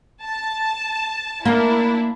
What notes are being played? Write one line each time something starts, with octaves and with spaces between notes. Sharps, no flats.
A5
A#3 D4 E4